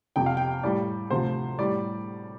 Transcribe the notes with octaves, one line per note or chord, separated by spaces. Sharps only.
F2 C3 F3 G5
F5
G5
A2 G3 D5
D2 C3 F3 C5
A2 G3 D5